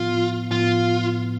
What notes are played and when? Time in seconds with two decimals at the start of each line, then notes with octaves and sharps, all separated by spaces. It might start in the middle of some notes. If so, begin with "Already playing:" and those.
Already playing: A2 F3 B3 F4
0.51 A2 F3 B3 F4